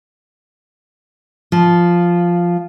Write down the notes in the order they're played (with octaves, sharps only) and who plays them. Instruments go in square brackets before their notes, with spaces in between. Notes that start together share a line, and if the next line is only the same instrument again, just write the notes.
[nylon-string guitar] F3